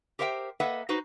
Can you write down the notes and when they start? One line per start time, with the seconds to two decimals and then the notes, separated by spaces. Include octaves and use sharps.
0.19 G4 A#4 C5 E5 F5 G5
0.60 A#3 A4 B4 D#5 E5 F#5
0.89 D#4 F#4 B4 C5